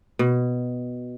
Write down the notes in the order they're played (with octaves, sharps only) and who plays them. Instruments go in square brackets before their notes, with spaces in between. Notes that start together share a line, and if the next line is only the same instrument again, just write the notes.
[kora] B2